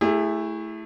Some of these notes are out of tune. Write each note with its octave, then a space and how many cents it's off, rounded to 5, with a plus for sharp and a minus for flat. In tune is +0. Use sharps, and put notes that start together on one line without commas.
A3 +0 E4 +0 G#4 -40